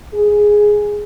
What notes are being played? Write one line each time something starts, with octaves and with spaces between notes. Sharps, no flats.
G#4